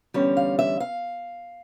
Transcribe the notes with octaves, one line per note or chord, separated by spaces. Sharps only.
E2 D3 G3 C#4
F5
E5
F5